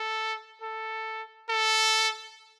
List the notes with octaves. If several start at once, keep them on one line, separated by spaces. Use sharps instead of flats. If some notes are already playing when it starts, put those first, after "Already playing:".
Already playing: A4
A4
A4